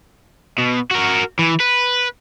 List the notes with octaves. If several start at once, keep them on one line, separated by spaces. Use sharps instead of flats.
B2
F#4 A#4
E3
B4